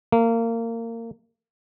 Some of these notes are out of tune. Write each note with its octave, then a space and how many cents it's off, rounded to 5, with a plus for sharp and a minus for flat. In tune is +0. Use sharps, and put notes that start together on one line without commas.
A#3 -25